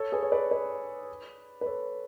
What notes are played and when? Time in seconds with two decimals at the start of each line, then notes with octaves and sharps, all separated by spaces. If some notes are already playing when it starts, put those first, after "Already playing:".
Already playing: A4 C#5
0.12 G#4 B4
0.23 C#5
0.32 B4 D5
0.51 B4 D5
1.61 B4
1.66 A4 C#5